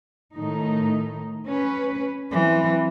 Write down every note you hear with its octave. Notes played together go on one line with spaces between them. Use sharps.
A2 D#3 D#4
C#4 B4
E3 F#3 C4